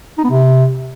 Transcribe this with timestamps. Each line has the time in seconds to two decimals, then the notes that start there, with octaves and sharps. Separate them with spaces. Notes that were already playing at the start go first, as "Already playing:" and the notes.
0.18 D#4
0.24 B3
0.30 C3